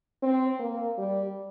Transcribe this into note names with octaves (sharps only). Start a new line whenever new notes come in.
C4
A#3
G3